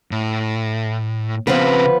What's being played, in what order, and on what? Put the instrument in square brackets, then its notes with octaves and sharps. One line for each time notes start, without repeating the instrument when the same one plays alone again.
[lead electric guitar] A2
[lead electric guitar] C#3 C4 [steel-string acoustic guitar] F3 B3 B4